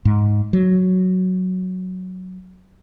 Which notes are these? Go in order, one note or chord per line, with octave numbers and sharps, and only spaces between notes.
G#2
F#3